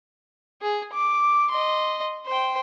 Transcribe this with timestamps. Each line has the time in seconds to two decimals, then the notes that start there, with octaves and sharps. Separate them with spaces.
0.62 G#4
0.93 D6
1.51 D#5 C6
2.26 C5 G5